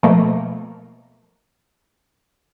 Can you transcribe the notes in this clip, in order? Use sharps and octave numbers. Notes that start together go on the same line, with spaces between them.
B2 F3 A3 A#3